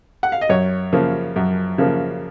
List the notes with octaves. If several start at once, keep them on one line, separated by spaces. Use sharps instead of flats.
F#5
F5
D#5
F#2 C#5
C#3 F3 A#3
F#2
C#3 F3 A#3